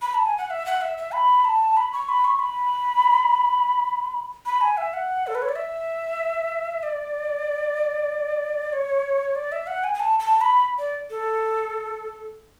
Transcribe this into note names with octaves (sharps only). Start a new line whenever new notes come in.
B5
A5
G#5
F#5
E5
F#5
E5
E5
B5
A5
B5
C#6
B5
C#6
B5
B5
G#5
E5
F#5
A4
B4
C#5
D5
E5
D5
C#5
D5
E5
F#5
G#5
G#5
A5
A5
B5
D5
A4